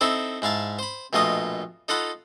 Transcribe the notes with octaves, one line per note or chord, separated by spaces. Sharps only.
C4 D#4 E4 A4 C5
G#2 E4 F5 A5
C5 B5
A#1 B2 A3 F4 D#5 D#6
D#4 F4 A4 F#5 B5